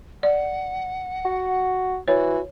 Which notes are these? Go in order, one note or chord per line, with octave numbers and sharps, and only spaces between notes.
D5 F#5
F#4
E3 F#4 C#5